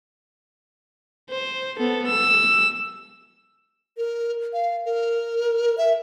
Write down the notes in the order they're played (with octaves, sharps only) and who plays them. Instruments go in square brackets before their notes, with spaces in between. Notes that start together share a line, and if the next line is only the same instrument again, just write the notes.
[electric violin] C5
B3 A4
E6
[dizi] A#4
F5
A#4
E5